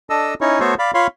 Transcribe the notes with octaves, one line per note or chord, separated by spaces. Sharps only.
D4 A4 D#5 E6
C#4 D#4 E4 C#5
A3 B3 F#4 A4 C5 C#5
D5 F5 B5
F4 C#5 F5 B5 C6